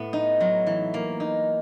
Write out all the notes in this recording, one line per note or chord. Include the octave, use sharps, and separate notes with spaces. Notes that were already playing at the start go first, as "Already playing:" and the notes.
Already playing: A2 B3
D#4
F#3
E3
A#3
D#4